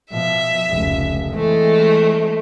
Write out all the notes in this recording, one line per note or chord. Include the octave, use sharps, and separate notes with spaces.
B2 F3 E5
F1 C#2
E3 G#3 A3 C4